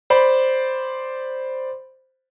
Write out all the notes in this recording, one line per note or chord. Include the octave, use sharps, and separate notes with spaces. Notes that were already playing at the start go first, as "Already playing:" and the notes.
C5 D5 B5